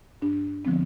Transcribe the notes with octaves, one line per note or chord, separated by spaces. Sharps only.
G2 D4
D3 F3 G#3 B3 C4